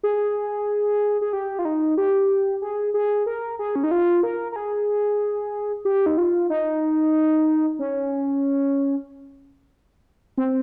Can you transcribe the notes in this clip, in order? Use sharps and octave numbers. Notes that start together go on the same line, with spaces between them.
G#4
G#4
G4
F4
D#4
G4
G#4
G#4
A#4
G#4
C#4
D#4
F4
A#4
A#4
G#4
G4
D#4
F4
D#4
C#4
C4